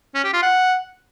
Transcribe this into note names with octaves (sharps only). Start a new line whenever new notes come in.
C#4
G4
F4
F#5